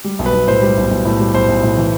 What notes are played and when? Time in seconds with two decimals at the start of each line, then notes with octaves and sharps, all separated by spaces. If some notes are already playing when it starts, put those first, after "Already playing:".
0.04 G3
0.19 B1
0.26 B4
0.33 B1
0.48 A2 C5
0.62 G3
0.77 B1
0.91 B1
1.05 A2
1.20 G3
1.34 B1 C5
1.48 B1
1.63 A2
1.78 E3